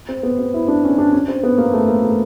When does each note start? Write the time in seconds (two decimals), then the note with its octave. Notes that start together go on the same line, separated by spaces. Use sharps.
0.09 C4
0.23 B3
0.39 C4
0.54 E4
0.68 D4
0.84 C#4
0.98 D4
1.13 C#4
1.28 C4
1.43 B3
1.58 A#3
1.73 A3
1.88 A#3
2.04 A3